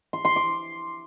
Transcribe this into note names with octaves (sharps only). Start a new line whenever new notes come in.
C6
C6
D6